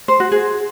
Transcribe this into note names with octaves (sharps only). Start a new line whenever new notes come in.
C5
F#4
G#4